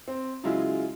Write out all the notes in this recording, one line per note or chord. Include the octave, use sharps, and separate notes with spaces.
C4
C#3 F#3 G#3 E4 F4